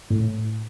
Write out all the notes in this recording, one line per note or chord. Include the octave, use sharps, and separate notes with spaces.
A2